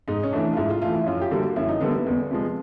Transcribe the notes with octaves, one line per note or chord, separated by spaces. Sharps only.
G#2 D#4
C#4
E3 A3 D4
F4
G#2 E4
F4
E3 A3 F4
E4
F#2 F4
G4
D3 G3 A#3 F#4
F#2 E4
D#4
D3 G3 A#3 B3
B3
E2
C3 F3 G#3